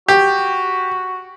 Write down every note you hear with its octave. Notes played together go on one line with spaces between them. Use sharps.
F#4 G4